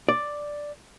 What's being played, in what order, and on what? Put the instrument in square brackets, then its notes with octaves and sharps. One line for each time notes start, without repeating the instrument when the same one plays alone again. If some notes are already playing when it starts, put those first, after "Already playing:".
[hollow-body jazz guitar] D5